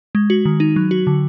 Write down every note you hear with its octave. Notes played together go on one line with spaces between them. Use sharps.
G#3
F#4
D#3
D#4
F#3
F#4
D3